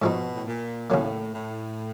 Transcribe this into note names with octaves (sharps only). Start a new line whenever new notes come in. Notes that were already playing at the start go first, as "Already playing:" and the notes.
G#2 B2 F3 G#3 C4 D#4
A2
A#2
D#2 A2 C#3 F#3 A#3
A2